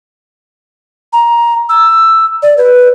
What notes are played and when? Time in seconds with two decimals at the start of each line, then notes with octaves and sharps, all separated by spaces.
1.13 A#5
1.69 E6
2.43 D5
2.58 B4